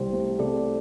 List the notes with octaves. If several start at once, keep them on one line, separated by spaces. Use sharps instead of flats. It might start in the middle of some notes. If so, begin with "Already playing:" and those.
Already playing: C2 C3 G4 C5
A3
C3 A4 D5